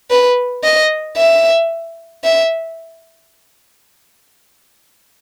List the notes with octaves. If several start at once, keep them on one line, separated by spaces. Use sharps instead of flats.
B4
D#5
E5
E5